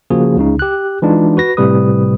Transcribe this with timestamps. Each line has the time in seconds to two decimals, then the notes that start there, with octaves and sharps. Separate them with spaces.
0.10 C#3 F3 A#3 F#4 G#4
0.37 C#2 C#3 D#4
0.59 G4 F#6
1.02 E3 G#3 D4 D#4 F4
1.37 F#4 B4 A#6
1.57 A2 C3 G3 B4 D#6